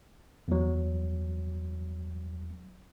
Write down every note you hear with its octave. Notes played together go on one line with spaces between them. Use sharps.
E2 F#3